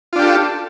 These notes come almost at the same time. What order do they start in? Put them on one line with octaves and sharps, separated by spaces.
F4 D4 G4 A4